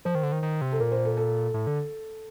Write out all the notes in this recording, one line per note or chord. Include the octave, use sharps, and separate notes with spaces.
F3 C5
D#3
D3
D#3
D#3
C3
A4
A#2 A#4
C5
A4
A4
A2
D3